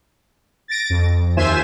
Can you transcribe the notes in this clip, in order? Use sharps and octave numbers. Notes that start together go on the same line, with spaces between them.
A6 A#6 D7
F2
D#2 F4 C5 E5 G#5 E7